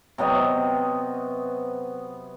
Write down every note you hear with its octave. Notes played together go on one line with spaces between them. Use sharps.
C3 F#3 B3 D#5